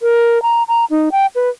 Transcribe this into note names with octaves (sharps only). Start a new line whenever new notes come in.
A#4
A#5
A#5
D#4
G5
B4